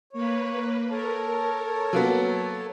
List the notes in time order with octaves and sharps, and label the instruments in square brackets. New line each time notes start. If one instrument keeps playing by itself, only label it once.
[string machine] A#3 B4 [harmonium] C#5
[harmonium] A4 C#5 A5 [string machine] A#4
[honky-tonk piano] F#3 A#3 B3